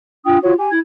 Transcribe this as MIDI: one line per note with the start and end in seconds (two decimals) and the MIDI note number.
0.25 0.38 62
0.25 0.38 65
0.25 0.38 79
0.25 0.38 87
0.43 0.53 65
0.43 0.53 66
0.43 0.53 73
0.56 0.68 67
0.56 0.68 80
0.71 0.78 64
0.71 0.78 92